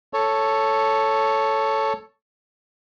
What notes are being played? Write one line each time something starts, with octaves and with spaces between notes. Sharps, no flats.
A4 C#5